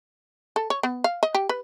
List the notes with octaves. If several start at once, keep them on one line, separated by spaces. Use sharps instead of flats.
A4
C#5
B3
F5
D#5
G4
B4